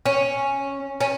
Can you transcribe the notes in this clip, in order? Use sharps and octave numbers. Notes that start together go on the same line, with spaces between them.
C#4
C#4